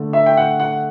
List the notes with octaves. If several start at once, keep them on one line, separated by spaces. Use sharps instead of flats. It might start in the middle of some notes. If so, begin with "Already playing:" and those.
Already playing: D3 A3
E5
G5
F#5
F#5